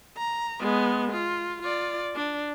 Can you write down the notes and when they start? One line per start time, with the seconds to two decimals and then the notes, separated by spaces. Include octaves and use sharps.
0.18 A#5
0.60 G#3 B3
1.12 F4
1.62 F4 D5
2.16 D4